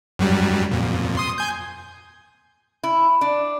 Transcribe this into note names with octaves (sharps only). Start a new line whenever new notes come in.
F#2 F#3 G3
F2 A#2
C6 D#6
G#5 G6
E4
D4